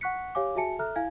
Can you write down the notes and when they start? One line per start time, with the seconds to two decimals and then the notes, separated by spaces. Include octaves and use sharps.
0.01 F#5 C#6 F#6 B6 C#7
0.35 G4 C#5 F5 G#5 D6
0.55 F#4 G#4 E5 G#5 A5 C#7
0.79 A4 E5 A#5 F6 F#6
0.96 E4 F5 G#5 G#6